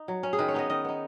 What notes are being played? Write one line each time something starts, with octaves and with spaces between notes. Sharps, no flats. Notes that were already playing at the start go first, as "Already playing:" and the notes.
Already playing: D#4
F#3
C#4
G#4
D#3 B4
C#5
B3 D#4 D#5
D#3 D#5
B3 D#4